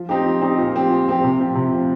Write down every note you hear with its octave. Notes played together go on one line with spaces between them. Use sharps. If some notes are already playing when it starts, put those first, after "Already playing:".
Already playing: F3
C4 D#4 G4
F3
C4 D#4 G4
A#2
F3 C4 G4
A#2
F3 C4 G4
C3
F3 C4
C3
F3 C4